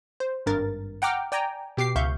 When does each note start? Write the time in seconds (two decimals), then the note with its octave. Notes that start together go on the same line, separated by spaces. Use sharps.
0.20 C5
0.46 G#1 G2 A#4 A6
1.02 F#5 G5 A#5 D6 F6
1.32 D5 G5 G#5 A#5
1.77 B2 G4 D6 C7
1.96 C#2 E5 F5 C#6 G6